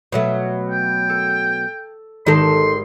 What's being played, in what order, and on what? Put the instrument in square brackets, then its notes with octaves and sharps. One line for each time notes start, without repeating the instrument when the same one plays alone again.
[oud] B2 F#3 A3
[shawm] G5
[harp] A4
[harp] G#1 D#3 G4 [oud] D#4 A4 [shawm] C6